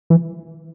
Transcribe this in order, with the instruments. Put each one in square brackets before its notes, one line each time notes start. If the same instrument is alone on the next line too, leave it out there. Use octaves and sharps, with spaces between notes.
[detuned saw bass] E3